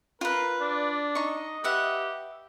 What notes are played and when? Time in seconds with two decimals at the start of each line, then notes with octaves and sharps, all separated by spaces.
0.21 F4 A#4 B4
0.60 D4 D5
1.15 D#4 D#5 C#6
1.64 G4 B4 E5 F#5